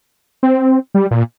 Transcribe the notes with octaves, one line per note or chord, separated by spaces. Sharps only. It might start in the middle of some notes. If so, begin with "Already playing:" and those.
C4
G3
A#2